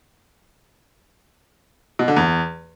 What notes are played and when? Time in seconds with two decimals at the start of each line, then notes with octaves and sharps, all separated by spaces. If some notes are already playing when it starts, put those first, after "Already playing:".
1.99 B2
2.08 D3
2.16 E2